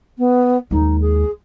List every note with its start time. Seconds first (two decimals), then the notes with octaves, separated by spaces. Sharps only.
0.18 B3
0.71 D#2 G#3 D#4
1.00 G#4